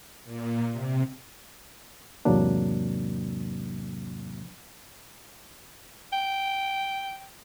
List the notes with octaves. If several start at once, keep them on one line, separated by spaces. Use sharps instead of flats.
A#2
C3
E2 G#2 C3 F#3 A#3 D4
G5